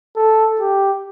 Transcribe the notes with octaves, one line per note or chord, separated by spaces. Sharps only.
A4
G4